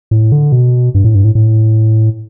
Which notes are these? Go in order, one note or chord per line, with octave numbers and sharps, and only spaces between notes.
A2
D3
B2
G2
A2
G2
A2
A2